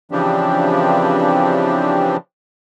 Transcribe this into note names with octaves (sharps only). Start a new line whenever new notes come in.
C#3 E3 F3 C4 D4 G4